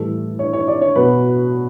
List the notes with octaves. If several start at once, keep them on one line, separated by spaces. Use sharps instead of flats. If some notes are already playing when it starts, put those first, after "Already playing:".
Already playing: A2 E3 G3 A4
C#5
C#5
D5
C#5
B2 F#3 B4